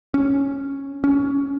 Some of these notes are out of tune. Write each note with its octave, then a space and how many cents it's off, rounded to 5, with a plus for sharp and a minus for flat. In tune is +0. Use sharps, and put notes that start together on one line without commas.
C#4 -5
C#4 +15